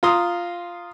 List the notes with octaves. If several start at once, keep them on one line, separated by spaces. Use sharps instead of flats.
F4 A#5 C6 D#6